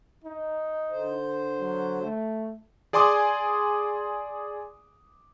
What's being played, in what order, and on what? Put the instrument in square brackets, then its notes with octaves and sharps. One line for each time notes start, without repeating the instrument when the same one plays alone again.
[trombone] D#4
[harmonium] D3 C5
[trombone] F#3
A3
[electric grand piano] G#4 D5 G#5 C6 D6 D#6